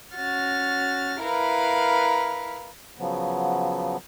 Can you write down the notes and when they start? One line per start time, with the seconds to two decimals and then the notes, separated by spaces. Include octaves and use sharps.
0.14 C#4 F#4 F6 A6
1.22 E4 A#4 B4 F5 A#5
2.99 C#3 F3 F#3 B3